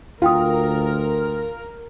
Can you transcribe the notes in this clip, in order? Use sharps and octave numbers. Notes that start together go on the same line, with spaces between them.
D2 F4 A#4 F5 G5 D#6